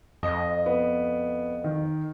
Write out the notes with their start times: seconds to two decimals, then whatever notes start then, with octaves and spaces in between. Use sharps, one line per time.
0.23 F2 D#5
0.66 B3
1.64 D#3